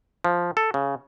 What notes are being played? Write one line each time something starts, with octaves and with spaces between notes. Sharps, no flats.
F3
A4
C#3